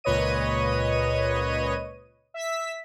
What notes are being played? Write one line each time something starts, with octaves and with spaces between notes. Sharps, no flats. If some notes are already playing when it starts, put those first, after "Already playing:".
C#2 A#2 B4 C#5 D#5 D#7
E5 E6 B6